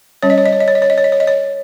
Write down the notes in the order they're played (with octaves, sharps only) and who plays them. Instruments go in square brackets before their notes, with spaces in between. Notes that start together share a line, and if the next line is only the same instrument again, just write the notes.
[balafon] G3 C#4 C#5
D#5
C#5
D#5
C#5
D#5
C#5
D#5
C#5
D#5
C#5
D#5
C#5
D#5
C#5